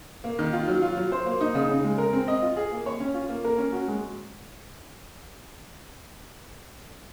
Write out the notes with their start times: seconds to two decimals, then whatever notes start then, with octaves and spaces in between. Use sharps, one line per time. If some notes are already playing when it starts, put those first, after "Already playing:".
0.24 A#3
0.39 D#3
0.53 F4
0.68 F#3
0.82 F4
0.97 F#3
1.12 C5
1.26 A#3
1.41 D#4
1.55 C#3
1.69 C#3
1.84 G#3
1.98 A#4
2.13 C4
2.28 D#5
2.42 F4
2.56 G#4
2.71 A#3
2.86 C#5
3.00 C#4
3.14 F4
3.29 A#3
3.44 A#4
3.58 C#4
3.72 F#4
3.88 G#3